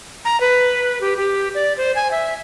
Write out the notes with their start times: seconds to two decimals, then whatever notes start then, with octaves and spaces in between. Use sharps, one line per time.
0.25 A#5
0.41 B4
1.01 G4
1.17 G4
1.55 D5
1.77 C5
1.96 G#5
2.11 E5